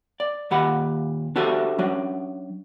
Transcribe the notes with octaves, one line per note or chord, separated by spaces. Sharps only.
D5
D#2 A#2 D#3 G4 F#5 B5
D4 F#4 G4 A4 C5 E5
F#3 C#4 D4